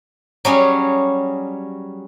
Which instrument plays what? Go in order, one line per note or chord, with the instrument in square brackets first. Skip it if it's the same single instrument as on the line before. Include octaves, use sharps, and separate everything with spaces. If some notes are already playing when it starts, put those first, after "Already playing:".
[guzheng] F#3 G3 C#4 G#4